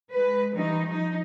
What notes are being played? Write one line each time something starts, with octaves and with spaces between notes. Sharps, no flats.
G#3 B4
D#3 E3 G3 D#4
F3 D#4